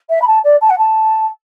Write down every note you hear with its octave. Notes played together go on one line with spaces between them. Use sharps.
E5
B5
A5
D5
A5
F#5
A5